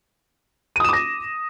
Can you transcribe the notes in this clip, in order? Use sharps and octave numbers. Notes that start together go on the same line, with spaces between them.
D6 D#6 A#6 D#7 E7